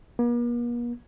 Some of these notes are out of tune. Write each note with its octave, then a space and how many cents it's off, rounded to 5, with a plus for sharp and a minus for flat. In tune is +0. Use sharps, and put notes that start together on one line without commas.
A#3 +45